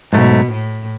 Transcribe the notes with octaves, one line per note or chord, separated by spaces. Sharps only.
G#2 B2 F#3 A3
A2